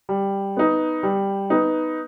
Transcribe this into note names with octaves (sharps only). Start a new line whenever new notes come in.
G3
B3 D#4
G3
B3 D#4